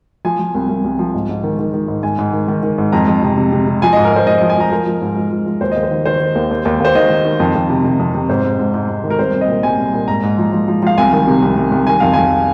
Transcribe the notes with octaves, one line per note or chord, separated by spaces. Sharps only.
F3 G#5
F3
C2
C2
C2
F3
G#2
G#2
D#3
D#3
D#3
G#2
G#2 G#5
G#2
D#3
D#3
D#3
G#2
F2 A#5
F2
C3
C3
C3
C3
F3 G#5
G#2 D#5
A#4
G#2 C5
G#2 D#5
F3 D#5
G#5
F3 A#5
F3 A#4
F3
G#2
F3
F3
F3
D#2 C5
D#2 D#5
C5
D#3
D#3 C5
D#3
D#2
D#2
D#2
D#2 C5
D#3 D#5
D#3
D#3
F2
F2
C3
C3
F2
C3
G#2 C5
G#2
G#2
G#2
G#2
D#3
A#4
C2 C5
C2
D#5
A#2
C2 G#5
C2
A#2
G#2 A#5
G#2
F3
F3
F3
F3 F5
C2 G#5
D#3
C3
C2
C2
C2
D#3 G#5
F2 F5
F2 G#5